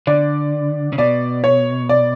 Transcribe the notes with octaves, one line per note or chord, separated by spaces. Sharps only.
D3 D5
C#3
B2 D5
C#5
D5